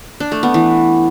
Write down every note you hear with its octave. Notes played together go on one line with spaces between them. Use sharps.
D4
A3
B3
E3